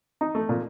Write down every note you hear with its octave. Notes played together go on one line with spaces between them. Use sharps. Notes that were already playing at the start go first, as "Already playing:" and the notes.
D#4
A3
A#2